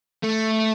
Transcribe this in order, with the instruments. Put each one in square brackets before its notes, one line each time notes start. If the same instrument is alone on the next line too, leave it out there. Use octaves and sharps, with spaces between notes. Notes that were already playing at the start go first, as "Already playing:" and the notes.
[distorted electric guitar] A3